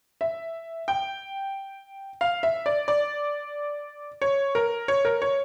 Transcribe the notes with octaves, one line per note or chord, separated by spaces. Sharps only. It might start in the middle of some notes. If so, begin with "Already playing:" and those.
E5
G5
F5
E5
D5
D5
C#5
A#4
C#5
A#4
C#5